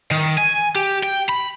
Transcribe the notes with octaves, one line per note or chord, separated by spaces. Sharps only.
D#3
G#5
G4
G5
B5